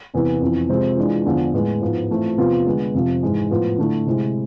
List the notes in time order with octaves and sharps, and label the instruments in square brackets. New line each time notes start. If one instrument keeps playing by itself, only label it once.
[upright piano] E2 C3 E3 B3
F2 E3 B3
C3 F3 G#3 C4 F4
E3 G#3 D4 F4
E2 D3 F3
A2 G#3 B3
G#2 F3 B3 E4
E3 A3 C4 F4
E2 C3 F3 B3 F4
D3 G#3 B3
F2 C3 F3
G#2 E3 G#3
A2 F3 B3 F4
D3 A3 E4
C3 G#3 C4 E4